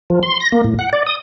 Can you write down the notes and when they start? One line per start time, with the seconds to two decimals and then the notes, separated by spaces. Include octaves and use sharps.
0.10 F3
0.23 C6
0.40 A#6
0.52 A#3
0.64 A2
0.79 F#5
0.93 D5
1.06 D#6